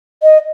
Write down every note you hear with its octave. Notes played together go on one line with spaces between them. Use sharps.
D#5